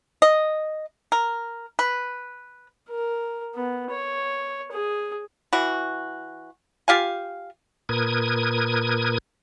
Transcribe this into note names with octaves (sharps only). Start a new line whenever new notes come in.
D#5
A#4
B4
A#4
B3
C#5
G#4
E3 F#4
F4 G4 F5 G#5
A#2 A#4 B4 D#6 G#6